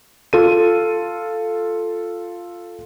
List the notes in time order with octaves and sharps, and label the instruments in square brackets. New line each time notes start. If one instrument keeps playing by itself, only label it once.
[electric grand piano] F4 A4 D#7